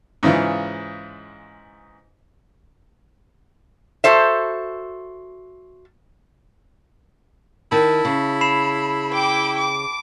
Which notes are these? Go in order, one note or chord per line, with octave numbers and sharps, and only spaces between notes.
G#2 C#3 E3 F4
F#4 A4 C5 E5
D#3 E4 A5 A6
C#3
B5 C7 E7
G5 D6
D6